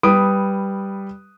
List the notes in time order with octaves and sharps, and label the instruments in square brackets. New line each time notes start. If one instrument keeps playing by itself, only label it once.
[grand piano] G3 B4 D#6 D7